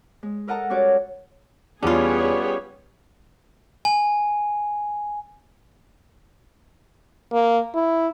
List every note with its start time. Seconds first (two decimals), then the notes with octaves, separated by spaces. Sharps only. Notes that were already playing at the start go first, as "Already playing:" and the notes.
0.23 G#3
0.47 A4 A#4 D#5 F#5 A5 A#5
0.70 G3 C#4 F#4 C#5 D5
1.83 E2 G3 B3 C#4 D4 F4 G#4 C#5
3.85 G#5
7.32 A#3
7.74 E4